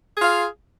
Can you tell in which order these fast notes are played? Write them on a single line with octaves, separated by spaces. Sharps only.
G#4 F4 F5